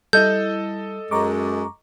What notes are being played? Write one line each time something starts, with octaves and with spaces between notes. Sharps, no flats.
G3 E4 A4 D#5 G6
F#2 G#3 A#5 C#6 D6